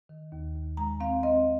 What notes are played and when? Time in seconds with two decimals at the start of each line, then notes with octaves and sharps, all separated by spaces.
0.09 D#3
0.32 D#2
0.55 D#2
0.77 G#3 A#5
1.00 C4 F5
1.23 C4 D#5